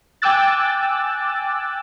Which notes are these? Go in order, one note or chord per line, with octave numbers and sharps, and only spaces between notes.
G5 G#5 D6 E6 F#6 A6